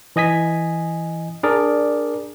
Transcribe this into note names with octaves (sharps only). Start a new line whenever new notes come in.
E3 D#5 G#5 B6
D4 G#4 A#4 D5